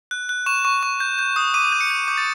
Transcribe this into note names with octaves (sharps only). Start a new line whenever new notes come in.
F#6
F#6
C#6 E7
C#6
C#6
G6
G6
D#6
D6 D#7
G6
C#7
G6
D6 G6
A6